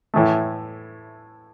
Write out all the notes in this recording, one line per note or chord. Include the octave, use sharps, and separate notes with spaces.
A2 E3 A3